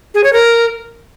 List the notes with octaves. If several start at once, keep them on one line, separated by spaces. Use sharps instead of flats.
G#4
C#5
A#4